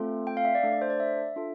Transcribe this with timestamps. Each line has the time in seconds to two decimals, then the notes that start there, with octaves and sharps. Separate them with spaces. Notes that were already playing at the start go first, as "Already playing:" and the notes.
Already playing: A3 C4 F4 A4
0.27 G5
0.37 F5
0.45 E5
0.55 D5
0.63 A3 D4 A4
0.72 D5
0.82 C5
0.90 D5
1.00 E5
1.36 D4 F4 A4